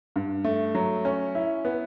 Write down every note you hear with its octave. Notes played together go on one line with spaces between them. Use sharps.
G2
A3
F#3
C#4
E4
B3